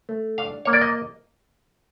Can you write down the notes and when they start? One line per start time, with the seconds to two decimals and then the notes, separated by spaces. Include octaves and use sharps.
0.09 A3
0.38 D4 F5
0.65 A#3 C#5
0.73 D5
0.81 D#5